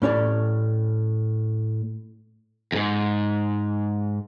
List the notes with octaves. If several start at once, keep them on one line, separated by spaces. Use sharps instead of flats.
A2 C#4 C#5 D5
E2 G#2